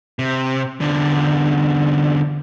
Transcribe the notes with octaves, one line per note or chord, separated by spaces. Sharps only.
C3
E2 D3